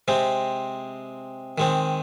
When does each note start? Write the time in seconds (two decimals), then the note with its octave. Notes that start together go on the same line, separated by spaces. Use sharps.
0.08 C3 G#3 C4
1.58 D#3 G#3 C4